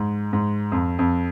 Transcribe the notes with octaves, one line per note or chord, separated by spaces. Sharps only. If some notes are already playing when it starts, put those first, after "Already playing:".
Already playing: G#2
G#2
F2
F2